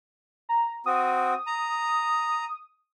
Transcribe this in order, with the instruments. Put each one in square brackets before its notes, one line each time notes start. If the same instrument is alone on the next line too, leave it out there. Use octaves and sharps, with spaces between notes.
[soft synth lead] A#5
[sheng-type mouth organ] C4 F#4 [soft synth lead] D#6
[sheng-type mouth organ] A#5